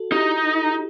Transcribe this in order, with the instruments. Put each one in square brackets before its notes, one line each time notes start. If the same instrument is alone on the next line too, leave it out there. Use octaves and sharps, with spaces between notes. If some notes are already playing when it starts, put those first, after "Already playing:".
Already playing: [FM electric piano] F#4 A4
[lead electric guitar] D#4 [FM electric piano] E4 G4